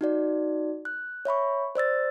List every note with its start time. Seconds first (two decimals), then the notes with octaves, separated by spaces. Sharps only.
0.01 D#4 F#4 D5
0.85 F#6
1.25 C#5 E5 B5 C#6
1.75 C5 D5 E6 A6